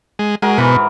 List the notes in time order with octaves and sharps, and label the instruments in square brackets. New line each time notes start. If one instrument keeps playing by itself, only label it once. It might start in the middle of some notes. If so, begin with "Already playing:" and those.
[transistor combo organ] G#3
[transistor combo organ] G#3 [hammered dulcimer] F#4 A#4
[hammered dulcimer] G#2 E3 [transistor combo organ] B2